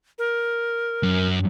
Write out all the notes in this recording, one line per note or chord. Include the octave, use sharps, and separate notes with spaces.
A#4
F#2